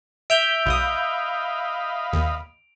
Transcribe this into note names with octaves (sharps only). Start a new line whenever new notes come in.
E5 G6 D7 F7
B1 D#5 F5 B5 D#6
D#2